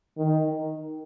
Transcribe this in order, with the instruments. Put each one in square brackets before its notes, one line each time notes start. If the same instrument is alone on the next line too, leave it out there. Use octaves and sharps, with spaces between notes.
[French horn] D#3